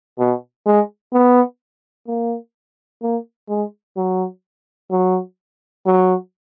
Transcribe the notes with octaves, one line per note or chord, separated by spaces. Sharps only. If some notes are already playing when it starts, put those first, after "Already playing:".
B2
G#3
B3
A#3
A#3
G#3
F#3
F#3
F#3